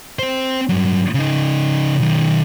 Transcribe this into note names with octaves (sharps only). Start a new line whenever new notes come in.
C4 C5
G2 F#3
C#3 D#4
B1 D#3